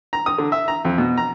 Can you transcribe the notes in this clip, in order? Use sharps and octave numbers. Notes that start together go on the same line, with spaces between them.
A#5
D#6
D3
E5
A#5
F2
B2
A#5